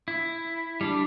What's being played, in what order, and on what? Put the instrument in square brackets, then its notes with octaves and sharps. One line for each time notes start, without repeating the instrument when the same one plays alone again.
[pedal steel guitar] E4
G3 D4